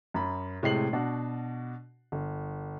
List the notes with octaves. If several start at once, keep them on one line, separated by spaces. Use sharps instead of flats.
F#2 B5
A2 C3 G#3 C7 F#7
B2 D4 F#4
G1